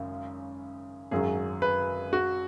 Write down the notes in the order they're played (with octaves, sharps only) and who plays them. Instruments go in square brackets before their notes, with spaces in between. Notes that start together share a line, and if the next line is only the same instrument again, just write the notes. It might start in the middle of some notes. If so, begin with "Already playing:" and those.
Already playing: [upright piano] G#1 F#2 C#3
[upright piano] G#1 F#2 F#3 [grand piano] G#4
[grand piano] B4
F#4